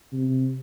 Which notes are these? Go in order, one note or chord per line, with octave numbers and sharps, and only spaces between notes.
C3